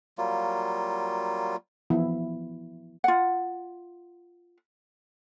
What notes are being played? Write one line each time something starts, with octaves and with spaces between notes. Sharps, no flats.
F#3 G3 A#3 F4
E3 F3 B3 E4
F4 F#5